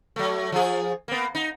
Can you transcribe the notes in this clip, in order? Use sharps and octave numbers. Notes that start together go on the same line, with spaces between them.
F#3 A3
F3 G#4
A#3 B3
D#4